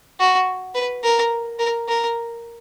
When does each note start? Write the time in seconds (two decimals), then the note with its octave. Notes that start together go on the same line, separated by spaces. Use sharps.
0.20 F#4
0.75 B4
1.04 A#4
1.59 A#4
1.88 A#4